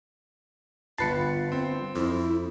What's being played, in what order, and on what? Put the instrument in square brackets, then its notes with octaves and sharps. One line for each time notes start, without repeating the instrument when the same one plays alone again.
[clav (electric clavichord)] G1 B4 A5 [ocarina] F4 [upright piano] C7 C#7
[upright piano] C4
[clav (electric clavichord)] F2 [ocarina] E4